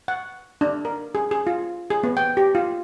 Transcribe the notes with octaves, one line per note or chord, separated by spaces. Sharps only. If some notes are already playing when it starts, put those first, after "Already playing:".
F#5
D4
A#4
G#4
G#4
F4
G#4
B3
G5
G4
F4